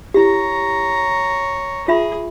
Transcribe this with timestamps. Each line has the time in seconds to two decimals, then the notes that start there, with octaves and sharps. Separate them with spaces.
0.14 E4 G4 C#5 A#5
1.88 F4 G#4 E5 B5